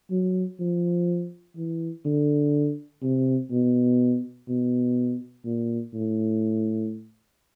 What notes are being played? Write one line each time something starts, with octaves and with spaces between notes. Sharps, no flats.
F#3
F3
E3
D3
C3
B2
B2
A#2
A2